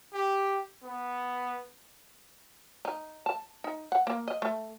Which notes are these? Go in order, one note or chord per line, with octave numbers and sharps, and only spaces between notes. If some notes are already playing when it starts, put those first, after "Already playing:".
G4
B3
D#4
A5
D#4
F#5
A#3
D#5
A3